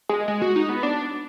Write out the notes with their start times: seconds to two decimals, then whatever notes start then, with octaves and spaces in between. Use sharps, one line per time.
0.09 G#3
0.28 G#3
0.42 F#4
0.56 D#4
0.69 B3
0.83 D4